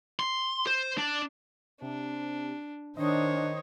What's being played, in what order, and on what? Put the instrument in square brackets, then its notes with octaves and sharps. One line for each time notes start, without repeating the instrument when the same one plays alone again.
[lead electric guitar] C6
C5
D4
[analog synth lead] C3 [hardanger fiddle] D4
[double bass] D#3 [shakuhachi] D4 [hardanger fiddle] C5 C#5 [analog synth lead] D#5